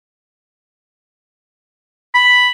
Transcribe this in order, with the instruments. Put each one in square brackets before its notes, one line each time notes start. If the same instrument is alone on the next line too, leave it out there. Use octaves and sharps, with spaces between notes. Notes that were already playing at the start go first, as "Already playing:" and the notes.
[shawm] B5